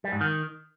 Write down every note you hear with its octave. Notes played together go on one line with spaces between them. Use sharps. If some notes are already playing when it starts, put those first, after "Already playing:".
G3
G#2
D#3